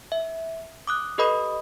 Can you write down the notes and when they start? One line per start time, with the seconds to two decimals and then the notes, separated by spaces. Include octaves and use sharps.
0.12 E5
0.87 D6 D#6 F#6
1.18 G4 A4 B4 D#5 B5 D#6